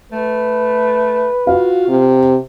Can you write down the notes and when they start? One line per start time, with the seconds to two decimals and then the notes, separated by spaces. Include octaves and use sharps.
0.12 A3 B4
1.47 F4 F#4 F5
1.88 C3